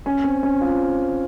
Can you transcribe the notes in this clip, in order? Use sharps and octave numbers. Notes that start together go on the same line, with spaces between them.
C#4
C4
C#4
F4